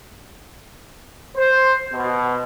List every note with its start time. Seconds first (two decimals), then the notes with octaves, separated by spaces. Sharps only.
1.35 C5
1.93 B2